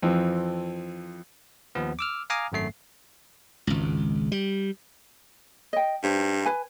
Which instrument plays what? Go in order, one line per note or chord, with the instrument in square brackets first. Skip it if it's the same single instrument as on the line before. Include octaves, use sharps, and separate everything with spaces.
[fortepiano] F2 E3 F3 C4
[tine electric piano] D#2 F3 B3
D6 E6 F6
F5 G#5 A#5 D6 D#6 F6
G#1 F#2 A3 C7
[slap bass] G#1 C#2
G3
[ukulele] D#5 G5
[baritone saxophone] G2 [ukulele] C5
[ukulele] B4 G#5